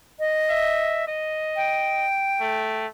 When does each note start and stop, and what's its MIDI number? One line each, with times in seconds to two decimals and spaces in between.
0.19 1.03 75
0.50 1.04 76
1.08 2.07 75
1.56 2.85 79
2.41 2.87 57